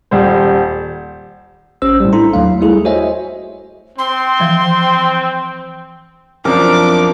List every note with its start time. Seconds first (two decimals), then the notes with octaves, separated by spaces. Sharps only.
0.11 D#1 G3 C5
1.82 A1 C#4 C5 E6
2.00 A2 G3
2.13 D4 E4 A4 A#5 C6
2.34 D#2 F#3 A3 F5
2.61 G3 A3 E4 G#4 A4
2.85 F#4 C5 C#5 D#5 E5 G#5
3.98 C4 C6
4.40 E3 F3
6.45 F#2 F3 C4 D4 A#4 D6